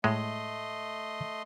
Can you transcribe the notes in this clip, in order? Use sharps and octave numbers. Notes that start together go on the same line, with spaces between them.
A2 G#3 A3 D#5 C6